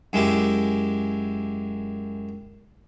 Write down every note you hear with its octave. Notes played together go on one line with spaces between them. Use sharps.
F#2 G#3 E4 G4 E5 D6